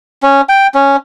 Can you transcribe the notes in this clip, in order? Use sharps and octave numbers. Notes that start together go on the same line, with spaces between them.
C#4
G5
C#4